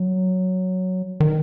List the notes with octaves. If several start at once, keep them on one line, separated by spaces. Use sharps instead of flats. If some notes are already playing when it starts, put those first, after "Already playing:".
Already playing: F#3
D#3